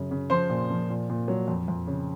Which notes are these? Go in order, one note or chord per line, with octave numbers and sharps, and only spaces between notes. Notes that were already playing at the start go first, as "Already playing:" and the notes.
Already playing: F#2 C#3
C#3
F3 C5 C6
A#2
F3
A#2
A#2
F#3
F2
F2
C#3